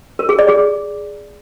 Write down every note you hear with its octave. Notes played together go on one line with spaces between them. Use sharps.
A#4
G#4
D5
G#4